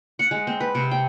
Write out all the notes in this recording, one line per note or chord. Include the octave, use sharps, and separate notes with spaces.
F#5
G#3
C4
B4
C3
G5